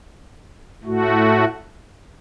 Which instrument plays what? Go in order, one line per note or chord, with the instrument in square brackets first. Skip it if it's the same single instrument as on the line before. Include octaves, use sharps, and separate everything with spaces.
[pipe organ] A2 A3 F#4